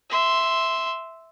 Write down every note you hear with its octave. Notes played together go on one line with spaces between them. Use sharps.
E5 C6